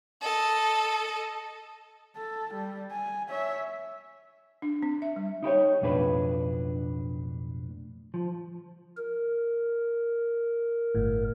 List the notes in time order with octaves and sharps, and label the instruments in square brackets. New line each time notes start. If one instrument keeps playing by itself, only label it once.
[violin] A4 D#5
[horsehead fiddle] A4
G3
G#5
C#5 E5
[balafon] D4
C4
E5
G3
[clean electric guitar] D#4 E4 G4 C#5
B1 F2 A2 D4 G#4 B4
F3
[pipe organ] A#4
[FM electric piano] G1 A2